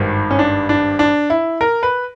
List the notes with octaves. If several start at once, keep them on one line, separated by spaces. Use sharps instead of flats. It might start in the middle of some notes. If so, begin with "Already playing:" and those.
Already playing: G#1 G2 D#3
C#4
D4
D4
D4
E4
A#4
B4